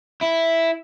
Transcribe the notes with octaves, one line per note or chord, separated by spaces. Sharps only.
E4